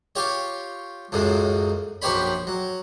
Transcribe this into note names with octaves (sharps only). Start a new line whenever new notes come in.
F4 G4 C#5
C#2 F#2 A2 G#3
A#1 F#2 G4 C5 C#5 B5
F#3